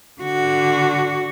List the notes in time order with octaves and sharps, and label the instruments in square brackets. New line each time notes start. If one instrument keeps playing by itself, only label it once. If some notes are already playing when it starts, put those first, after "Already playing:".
[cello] D3 F#4